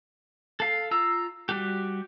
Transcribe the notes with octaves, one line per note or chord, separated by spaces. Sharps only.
A4 F5
F4 A#5 E6
G3 F#4 G4